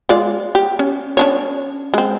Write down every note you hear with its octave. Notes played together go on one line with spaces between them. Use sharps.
G#3 F4 D5
G4
C#4
C#4 D4 C#5
G#3 C4